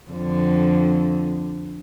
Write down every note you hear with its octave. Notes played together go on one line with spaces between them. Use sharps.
F2 D3